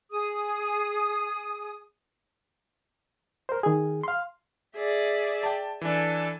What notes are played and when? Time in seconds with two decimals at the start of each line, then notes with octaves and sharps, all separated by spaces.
0.11 G#4 D#6
3.49 A#4 C5
3.63 D#3 G#4
4.04 F5 C6
4.77 G#4 D5 E5
5.43 G5 A5
5.81 E3 D4 A4 G#5